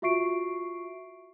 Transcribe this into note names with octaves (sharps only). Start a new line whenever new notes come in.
F4 F#4 E5 C#6 C7 D7